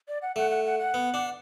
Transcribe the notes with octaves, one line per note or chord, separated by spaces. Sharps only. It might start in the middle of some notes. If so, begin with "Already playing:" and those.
D5
F#5
A3 F#5
F#5
F#5
F#5
B3
D4